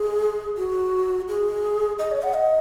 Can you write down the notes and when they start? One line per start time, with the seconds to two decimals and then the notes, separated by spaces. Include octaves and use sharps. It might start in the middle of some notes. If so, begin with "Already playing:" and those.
Already playing: G#4
0.58 F#4
1.28 G#4
1.99 D#5
2.11 C#5
2.23 F#5
2.35 D#5